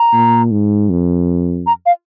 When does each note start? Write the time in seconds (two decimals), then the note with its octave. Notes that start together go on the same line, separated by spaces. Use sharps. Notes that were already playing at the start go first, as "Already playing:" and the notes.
Already playing: A#5
0.13 A#2
0.51 G#2
0.90 F2
1.67 A#5
1.86 F5